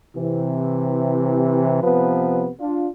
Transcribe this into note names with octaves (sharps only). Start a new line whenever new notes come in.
C3 E3
C3 F3 B3 B4
D4 F4